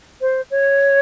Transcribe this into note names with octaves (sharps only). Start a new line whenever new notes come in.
C5
C#5